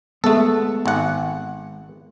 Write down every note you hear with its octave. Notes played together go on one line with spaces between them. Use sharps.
G#3 A3 B3 A4
G#1 F#5